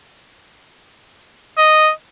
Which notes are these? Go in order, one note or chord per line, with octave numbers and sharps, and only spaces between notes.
D#5